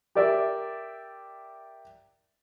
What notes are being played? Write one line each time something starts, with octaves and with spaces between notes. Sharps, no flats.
G4 A#4 D5 E5